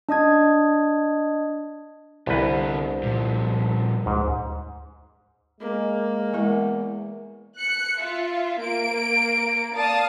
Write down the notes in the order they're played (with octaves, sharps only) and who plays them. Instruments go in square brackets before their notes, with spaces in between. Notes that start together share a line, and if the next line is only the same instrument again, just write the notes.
[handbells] D4 D#5 D#6 G#6
[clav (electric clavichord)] C2 B4 [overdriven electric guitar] D3 B3
[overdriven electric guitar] G2 F3 [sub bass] A#2
[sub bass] D2 [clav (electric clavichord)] G#2
[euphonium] G#3 [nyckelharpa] A#3
[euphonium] E2 [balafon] G#3 E4 A#4
[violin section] F#6 C#7
F4 E5
A#3 D7
D5 F5 A5 D#6